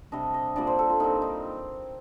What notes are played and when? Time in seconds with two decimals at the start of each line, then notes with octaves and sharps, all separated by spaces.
0.12 C3 G3 D4 D#5
0.34 D#5
0.56 A#2 G3 A#3 D4 D5
0.67 C5
0.79 A4
0.90 F4
1.00 A#2 G3 C4 D#4
1.22 D#4